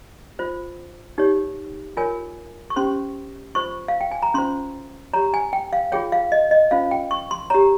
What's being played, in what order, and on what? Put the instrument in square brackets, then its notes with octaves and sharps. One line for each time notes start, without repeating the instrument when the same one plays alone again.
[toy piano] F4 C5
D#4 G4 C#5
F4 A#4 C#5 G#5
C#6
C#4 G4 C5 C6
F4 C5 C#6
F5
G5
G#5
A#5
C#4 F4 C5 C6
G4 C#5 A#5
G#5
G5
F5
F4 G#4 C#5 G5
F5
D#5
D#5
C#4 F4 C5 F5
G5
C#6
C6
G4 C#5 A#5